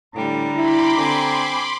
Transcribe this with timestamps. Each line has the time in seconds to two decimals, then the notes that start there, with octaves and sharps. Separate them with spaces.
0.15 A2 D3 G3 A#5
0.56 E4 B5 C6 D6
0.98 D3 C4 G#5